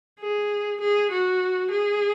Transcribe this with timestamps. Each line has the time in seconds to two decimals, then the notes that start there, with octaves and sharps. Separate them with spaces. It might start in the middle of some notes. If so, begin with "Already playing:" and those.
0.20 G#4
0.81 G#4
1.11 F#4
1.71 G#4